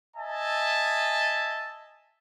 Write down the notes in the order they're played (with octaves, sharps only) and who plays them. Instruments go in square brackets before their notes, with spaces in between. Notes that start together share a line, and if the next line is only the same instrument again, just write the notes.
[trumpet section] D#5 E5 G#5 A5